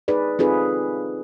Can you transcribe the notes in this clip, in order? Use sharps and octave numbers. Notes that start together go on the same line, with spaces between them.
D#4 G#4 B4 D5
C4 D#4 F4 G#4 A4 B4